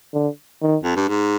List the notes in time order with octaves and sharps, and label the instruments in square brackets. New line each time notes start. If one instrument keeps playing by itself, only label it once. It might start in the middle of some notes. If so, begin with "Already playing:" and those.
[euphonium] D3
D#3
[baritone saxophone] F2
G2
G#2